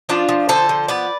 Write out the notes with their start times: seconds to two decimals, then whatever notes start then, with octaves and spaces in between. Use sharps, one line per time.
0.09 F3 D4 F4
0.29 F3
0.49 D3 A4 C5
0.69 F3
0.88 B3 B4 D5